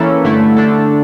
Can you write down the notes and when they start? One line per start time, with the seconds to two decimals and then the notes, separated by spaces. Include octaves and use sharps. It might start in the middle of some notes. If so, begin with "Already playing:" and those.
Already playing: E3 A#3 C#4 E4 A4
0.24 G2 D3 A3 E4
0.57 D3 A3 D4 A4